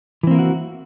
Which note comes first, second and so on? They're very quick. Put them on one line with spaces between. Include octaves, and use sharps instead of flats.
E3 C4 A#3 E4 F#4